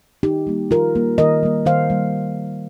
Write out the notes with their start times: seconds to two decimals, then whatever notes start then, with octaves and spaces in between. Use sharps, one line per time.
0.23 D#3 D#4 G4
0.47 G3 A#3
0.71 D#3 F4 A#4
0.95 G3 A#3
1.18 D#3 A#4 D#5
1.43 G3 A#3
1.65 D#3 C5 F5
1.90 G3 A#3